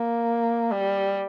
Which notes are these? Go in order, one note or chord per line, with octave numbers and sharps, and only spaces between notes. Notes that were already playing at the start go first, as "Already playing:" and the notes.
Already playing: A#3
G3